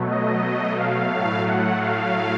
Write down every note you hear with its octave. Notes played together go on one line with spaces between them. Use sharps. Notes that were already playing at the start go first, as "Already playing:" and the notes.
Already playing: B2 F#3 A3
D#5
F5
A2 F#3 A3
F#5
F5